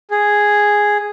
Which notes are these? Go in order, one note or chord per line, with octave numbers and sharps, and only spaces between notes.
G#4